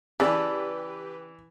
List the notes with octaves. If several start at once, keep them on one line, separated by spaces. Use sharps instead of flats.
C#3 E3 G4 B4 D5 A5